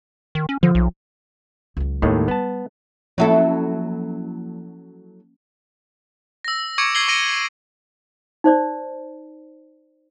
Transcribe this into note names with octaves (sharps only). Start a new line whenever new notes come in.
D#3
C#4
D3 F3
B1
C#2 F#3
D#2 A2 D#3 G#3 A#3
G3 B3 A5
F3 F#3 A#3 C#4 E4 A4
E6 A#6
C#6 D6 G#6 C#7 D7
G#6 C7 F#7 G7
C#6 D6 A#6 D7 D#7 G7
D#4 C5 D5